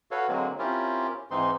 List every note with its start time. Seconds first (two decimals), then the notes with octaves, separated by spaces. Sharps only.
0.11 F#4 A4 B4 C#5 F5
0.29 D3 F#3 G#3 A#3 C4
0.59 C4 C#4 E4 F4 G4 A#4
1.31 G#2 E3 C4 D#4 C6